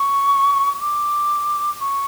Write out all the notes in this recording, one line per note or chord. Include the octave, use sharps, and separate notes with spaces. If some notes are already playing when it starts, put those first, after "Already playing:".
Already playing: C#6
D6
C#6